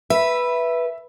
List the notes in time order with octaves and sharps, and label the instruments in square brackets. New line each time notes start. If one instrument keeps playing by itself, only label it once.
[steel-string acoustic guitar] B4 [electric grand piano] E5